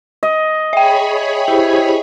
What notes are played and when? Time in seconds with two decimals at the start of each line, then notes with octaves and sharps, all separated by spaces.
0.23 D#5
0.73 G#4 C#5 E5 G5 B5
1.48 E4 G4 C5